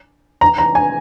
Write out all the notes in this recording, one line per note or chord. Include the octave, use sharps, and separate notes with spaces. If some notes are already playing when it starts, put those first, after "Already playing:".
A#5
A#5
G#5